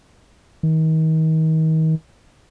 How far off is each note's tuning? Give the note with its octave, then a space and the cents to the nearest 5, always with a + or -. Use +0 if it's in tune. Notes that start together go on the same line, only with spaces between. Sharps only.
D#3 +35